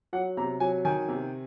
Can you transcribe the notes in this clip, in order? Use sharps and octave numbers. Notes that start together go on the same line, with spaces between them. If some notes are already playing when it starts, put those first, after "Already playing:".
F#3 F#5
C3 A#5
F#3 G#5
D#3 G#5
C3